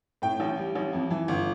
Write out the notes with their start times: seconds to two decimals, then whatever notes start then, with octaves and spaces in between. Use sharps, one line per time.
0.22 A2 G5
0.40 A1
0.58 G3
0.75 A1
0.93 F2
1.11 E3
1.28 G1